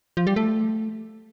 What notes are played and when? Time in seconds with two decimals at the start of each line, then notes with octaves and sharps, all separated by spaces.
0.17 F3
0.27 G3
0.36 A3